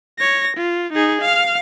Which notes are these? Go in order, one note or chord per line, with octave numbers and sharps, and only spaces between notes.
C#5 A#6
F4
D#4 G#4
F5 F6